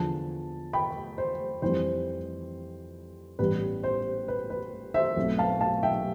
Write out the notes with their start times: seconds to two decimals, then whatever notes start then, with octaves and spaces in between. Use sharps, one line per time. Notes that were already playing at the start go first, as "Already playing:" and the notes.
Already playing: E2 D3 F3 A5
0.73 G5 B5
1.18 C5
1.62 F2 E3 G3 C4 C5
3.39 A1 A2 G3 B3 B4
3.83 C5
4.28 B4
4.50 B4
4.94 C5 E5
5.17 B1 B2 A3 C4
5.38 F5 A5
5.61 F5 A5
5.83 E5 G5